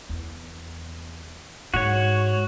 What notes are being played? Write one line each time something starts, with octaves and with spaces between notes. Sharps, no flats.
E2
G#2 F#4 C#5